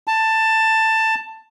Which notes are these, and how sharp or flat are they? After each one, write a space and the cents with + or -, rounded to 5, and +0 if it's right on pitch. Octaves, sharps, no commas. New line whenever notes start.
A5 +10